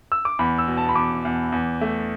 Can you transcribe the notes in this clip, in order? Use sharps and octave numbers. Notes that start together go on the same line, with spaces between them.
E6
D6
E2 B5
E6
B2
A5
B5
E2 D6
E2
E2
A3